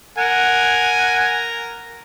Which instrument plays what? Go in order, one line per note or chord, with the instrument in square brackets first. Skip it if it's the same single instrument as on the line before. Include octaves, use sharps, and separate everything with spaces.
[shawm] A#4 [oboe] F#5 [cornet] G#5